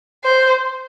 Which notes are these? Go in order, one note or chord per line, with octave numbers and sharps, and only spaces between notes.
C5